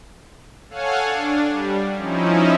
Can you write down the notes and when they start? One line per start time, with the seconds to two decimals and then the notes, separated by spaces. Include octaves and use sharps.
0.70 A4 C#5 F5 F#5 G#5
1.05 D4
1.48 G3
1.96 F3 C#4 D#4 E4